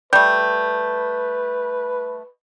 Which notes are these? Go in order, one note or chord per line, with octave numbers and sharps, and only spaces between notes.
G3 A3 B4 G6